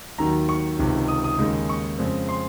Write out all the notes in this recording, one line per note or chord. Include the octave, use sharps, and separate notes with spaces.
D#2 D#3 F#3 A#5
C#6
C#2 C3 D#3
D#6
D#6
D#2 C#3 G#3 D#4
C#6
F2 C#3 G#3 C4
C6